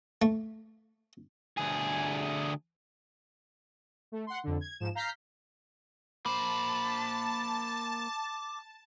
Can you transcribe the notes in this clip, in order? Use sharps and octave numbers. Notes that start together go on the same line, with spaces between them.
A3
D2 G#4
A3
F#5 C6
F2 D3
G#6
G#2 F3 E7
F5 A#5 F6 G6 B6 C7
A#3 C5 A5 B5 D6